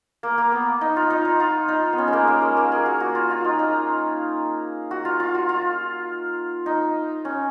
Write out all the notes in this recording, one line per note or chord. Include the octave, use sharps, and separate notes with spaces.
A#3
A#3
B3
D#4
F4
D#4
D#4
F4
D#4
B3
C#4
G#3
A#3
A#3
G#3
A#3
G#4
F#4
F#4
F4
F4
D#4
D#4
F#4
F4
F4
F#4
F4
D#4
C#4